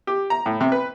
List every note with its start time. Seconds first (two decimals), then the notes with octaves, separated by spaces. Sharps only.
0.07 G4
0.30 A#5
0.46 A2
0.61 C3
0.72 B4